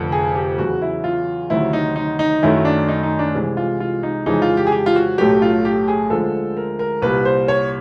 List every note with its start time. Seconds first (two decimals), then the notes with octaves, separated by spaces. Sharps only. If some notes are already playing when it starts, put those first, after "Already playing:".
Already playing: F1 F2 D3
0.12 G#4
0.35 G4
0.58 E2 C#3 F#3 F#4
0.82 E4
1.04 F4
1.50 D2 C3 D#3 F#3 E4
1.73 D#4
1.96 D#4
2.19 D#4
2.43 F#2 D#3 F#3 A3 E4
2.65 D4
2.89 D#4
3.03 D#4
3.19 D4
3.34 C2 C3 E3 G#3
3.57 F4
3.80 F4
4.03 D#4
4.26 F2 C#3 E3 G#3 D#4
4.42 F4
4.57 G4
4.67 G#4
4.72 G4
4.86 F4
4.96 F#4
5.18 B1 A2 F#3 A3 G4
5.42 F4
5.65 G4
5.88 G#4
6.10 D2 D3 F3 G#3 A4
6.57 A#4
6.79 A#4
7.02 C2 A#2 G3 B4
7.25 C5
7.48 C#5